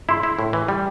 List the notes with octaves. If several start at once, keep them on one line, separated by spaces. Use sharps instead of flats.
E4 C6
E4
A2
E3
G3